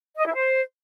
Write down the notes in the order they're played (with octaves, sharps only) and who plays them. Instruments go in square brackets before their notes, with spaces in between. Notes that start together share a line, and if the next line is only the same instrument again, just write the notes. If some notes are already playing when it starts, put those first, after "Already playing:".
[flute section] D#5
E4
C5